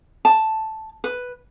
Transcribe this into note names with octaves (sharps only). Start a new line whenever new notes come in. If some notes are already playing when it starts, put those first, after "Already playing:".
A5
B4